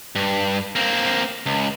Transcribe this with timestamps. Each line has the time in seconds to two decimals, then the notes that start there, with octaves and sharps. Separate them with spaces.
0.15 G2
0.76 A#3 C4
1.46 C#2